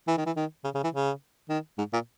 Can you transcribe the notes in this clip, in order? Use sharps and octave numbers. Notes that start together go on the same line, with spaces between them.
E3
D#3
E3
D#3
C#3
C#3
E3
C#3
D#3
G#2
A#2